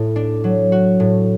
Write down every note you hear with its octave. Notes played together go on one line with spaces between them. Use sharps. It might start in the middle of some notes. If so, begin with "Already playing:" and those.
Already playing: A2 A3 E4
D4
F#3
F#4
A2